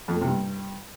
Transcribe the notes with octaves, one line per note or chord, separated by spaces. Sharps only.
F2
A3
C3
G2